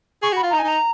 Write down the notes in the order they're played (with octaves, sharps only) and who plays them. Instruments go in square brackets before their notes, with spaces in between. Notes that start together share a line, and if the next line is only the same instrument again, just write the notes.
[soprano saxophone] G#4 [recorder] C#6
[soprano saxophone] F#4
[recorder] B5
[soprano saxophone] F4
[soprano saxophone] D#4 [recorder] A#5
[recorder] G#5
[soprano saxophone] D#4 [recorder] A#5